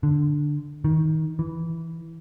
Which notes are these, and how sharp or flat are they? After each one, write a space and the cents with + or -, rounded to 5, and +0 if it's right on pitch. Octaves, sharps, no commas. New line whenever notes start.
D3 +5
D#3 +20
E3 +0